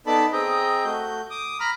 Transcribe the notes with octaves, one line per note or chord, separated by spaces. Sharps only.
B3 D#4 A4 D5 A5 B5
C4 G#4 D#5 G5 A#5
A3 F#4 G6
D6 D#6
A#5 B5 F6